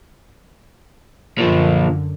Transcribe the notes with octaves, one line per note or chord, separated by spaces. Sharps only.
F#2 A#2 D3 F3